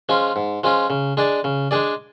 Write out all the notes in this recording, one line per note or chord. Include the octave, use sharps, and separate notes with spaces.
F3 G#3 C#4 F4
G#2
F3 G#3 C#4 F4
C#3
G#3 D4 G#4 D5
C#3
G#3 D4 G#4 D5